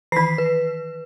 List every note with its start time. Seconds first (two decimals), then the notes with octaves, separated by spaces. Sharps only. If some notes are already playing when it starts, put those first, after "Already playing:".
0.12 D#3 E3 B6 C7
0.38 B4